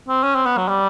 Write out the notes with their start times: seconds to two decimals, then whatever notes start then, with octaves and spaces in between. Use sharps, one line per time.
0.09 C4
0.24 C#4
0.35 C4
0.46 B3
0.58 F#3
0.68 G3